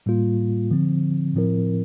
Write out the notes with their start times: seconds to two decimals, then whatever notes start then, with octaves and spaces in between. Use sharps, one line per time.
0.06 A2 G3 A#3 F4
0.71 D3 F3 C4
1.34 A2 F3 C4 E4 A#4